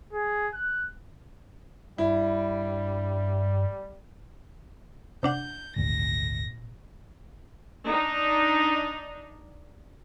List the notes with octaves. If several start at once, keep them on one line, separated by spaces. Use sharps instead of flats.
G#4
F#6
G2 G3 E4
C3 D4 F#5 G6
G#1 D2 A#2 A#6
D4 D#4